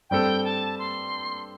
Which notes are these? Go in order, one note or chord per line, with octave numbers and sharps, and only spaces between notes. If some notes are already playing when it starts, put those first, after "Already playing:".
G2 G3 C4 A4 G5
A5
C6